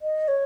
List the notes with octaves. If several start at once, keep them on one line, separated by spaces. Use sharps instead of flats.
D#5
C#5